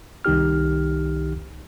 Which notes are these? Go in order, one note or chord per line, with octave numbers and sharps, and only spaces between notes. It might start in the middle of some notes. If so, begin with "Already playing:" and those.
C2 D#3 D#4 G4 F6